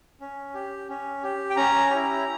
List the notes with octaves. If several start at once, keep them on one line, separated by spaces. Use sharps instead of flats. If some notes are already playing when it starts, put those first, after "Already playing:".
C#4
G4
C#4
G4
G5
C#4 A#5
E4 G4 A#5